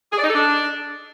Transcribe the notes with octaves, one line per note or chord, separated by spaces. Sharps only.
G#4
D5
D#4
A4
D4